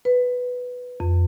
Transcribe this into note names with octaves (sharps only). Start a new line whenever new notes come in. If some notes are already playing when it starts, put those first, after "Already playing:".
B4
F2